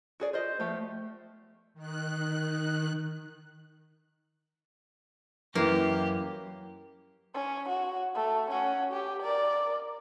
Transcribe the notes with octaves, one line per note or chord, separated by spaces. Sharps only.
F#4 G#4 D5
F4 C5 D5 D#5
F3 A3 B3 G4
D#3 F#6
F#2 E3 A#3 G4
C#4
F#4
A3
C#4 F#4
G4
A#4 D5